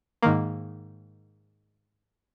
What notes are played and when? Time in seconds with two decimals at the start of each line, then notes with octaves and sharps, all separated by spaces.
0.23 G#2 D#3 A#3